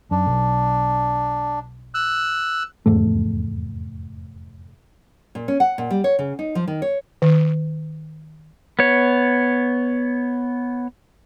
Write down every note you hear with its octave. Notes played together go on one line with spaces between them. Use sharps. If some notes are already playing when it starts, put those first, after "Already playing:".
F#2 D4
B1
E6 F#6
F1 E2 G#2 A3
A#2
C#4
F#5
A#2
G3
C#5
C#3
D#4
F3
D#3
C#5
D#3
B3 C#5